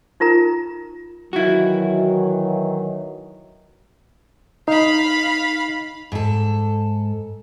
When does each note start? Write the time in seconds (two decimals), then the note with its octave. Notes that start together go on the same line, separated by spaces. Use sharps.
0.20 D#4 F4 A#4 A#5
1.33 D#3 E3 F#3 E4 F#4
4.68 D#4 F5 B5
6.12 G#2 A4